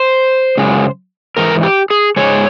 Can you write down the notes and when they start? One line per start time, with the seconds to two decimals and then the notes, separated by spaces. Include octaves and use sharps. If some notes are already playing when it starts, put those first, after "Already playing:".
Already playing: C5
0.57 F#2 C#3 G#3
1.37 G#2 E3 A#4
1.63 G4
1.90 G#4
2.16 G#2 E3 G#3 C#5